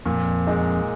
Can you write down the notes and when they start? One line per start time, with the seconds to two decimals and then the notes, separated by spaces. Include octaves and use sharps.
0.06 F2 A#2
0.47 G#3 D#4